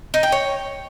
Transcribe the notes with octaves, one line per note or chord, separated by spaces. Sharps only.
D#4
G5
C#5